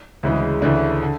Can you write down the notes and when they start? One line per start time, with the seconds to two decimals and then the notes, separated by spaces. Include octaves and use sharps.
0.23 D2 C#3 E3 G#3
0.62 D2 C#3 E3 A3 D4
1.03 D3